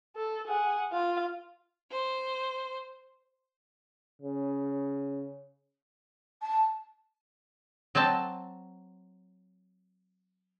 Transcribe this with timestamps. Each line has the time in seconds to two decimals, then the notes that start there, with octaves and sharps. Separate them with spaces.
0.16 A4
0.47 G#4 F#5
0.92 F4 F5
1.92 C5
4.22 C#3
6.42 A5
7.95 F#3 C4 D#5 A5